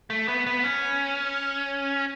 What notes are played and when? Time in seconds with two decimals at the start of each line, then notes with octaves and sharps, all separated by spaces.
0.10 A3
0.28 B3
0.47 B3
0.64 C#4